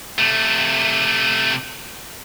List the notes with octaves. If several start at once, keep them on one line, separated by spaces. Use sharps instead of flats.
C3 A3